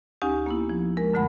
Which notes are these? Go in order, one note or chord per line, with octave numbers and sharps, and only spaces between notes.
D2 C#4 D#4 G4 G#5
A#3 B3 E4
F3
G#3 A#4
F#2 D3 A3 F#5 B5